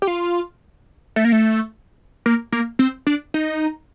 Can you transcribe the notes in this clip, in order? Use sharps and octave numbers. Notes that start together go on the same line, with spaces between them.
G4
F4
A3
A#3
A3
A#3
A#3
C4
D4
D#4